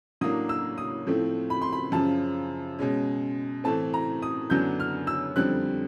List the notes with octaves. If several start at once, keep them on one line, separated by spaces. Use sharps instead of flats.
A2 F#3 A#3 D4 D#6
E6
D#6
A2 F3 A3 C4
B5
C6
B5
F#2 C#3 F3 A5
B2 G#3 C#4
A2 E3 A3 C4 A5
A#5
D#6
F#2 D3 F#3 B3 D4 G6
F6
E6
F2 D3 G3 C4 F#6